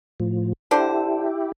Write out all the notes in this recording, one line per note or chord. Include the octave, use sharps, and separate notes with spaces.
A2 F3
D3 D4 E4 G4 C5